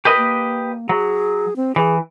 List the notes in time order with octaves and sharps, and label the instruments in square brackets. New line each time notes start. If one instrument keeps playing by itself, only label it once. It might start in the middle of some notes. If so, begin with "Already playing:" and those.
[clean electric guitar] G4 B4 D#5 [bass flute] A#4
[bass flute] A#3
[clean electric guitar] F#3 [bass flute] G#4
[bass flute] C4
[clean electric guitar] E3 [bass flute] G#4